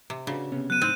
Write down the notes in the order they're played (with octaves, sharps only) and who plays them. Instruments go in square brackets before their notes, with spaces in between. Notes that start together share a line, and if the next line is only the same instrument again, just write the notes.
[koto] C3
[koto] C#3 [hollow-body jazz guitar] D4 F#4 B4
[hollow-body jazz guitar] C3 B3 C#4
[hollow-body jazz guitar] F#3 B3 [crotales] F#6 D#7
[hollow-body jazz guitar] A2 D#4 C5 [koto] C4